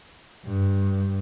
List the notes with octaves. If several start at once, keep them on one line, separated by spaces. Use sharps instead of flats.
G2